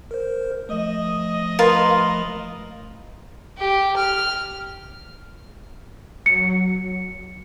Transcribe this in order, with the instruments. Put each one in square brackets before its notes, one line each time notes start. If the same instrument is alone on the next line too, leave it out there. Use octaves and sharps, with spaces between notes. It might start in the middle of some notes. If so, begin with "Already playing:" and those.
[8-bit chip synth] A#4 C5
[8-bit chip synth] F3 A3 [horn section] D#5
[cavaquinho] F4 A#4 B4
[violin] G4
F6
[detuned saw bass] F#3 [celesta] C#7